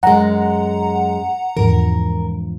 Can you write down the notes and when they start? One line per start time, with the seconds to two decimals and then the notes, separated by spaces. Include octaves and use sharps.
0.03 F#2 G#3 F#5 A#5
1.57 E2 G#2 D3 E3 F3 A#4